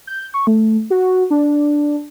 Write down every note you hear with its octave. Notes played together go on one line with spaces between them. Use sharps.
G6
C#6
A3
F#4
D4